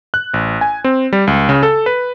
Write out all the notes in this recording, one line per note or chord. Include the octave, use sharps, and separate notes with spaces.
F#6
A1
G#5
C4
G3
C#2
C#3
A4
B4